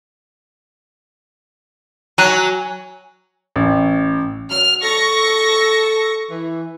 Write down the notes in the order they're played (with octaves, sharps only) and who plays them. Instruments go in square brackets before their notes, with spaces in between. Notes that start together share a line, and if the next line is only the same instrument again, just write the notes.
[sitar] F#3 [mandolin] G#5 A#5 F#6
[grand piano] A1
[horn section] F#3 [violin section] F6
[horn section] A4 [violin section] C#6 A#6
[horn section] E3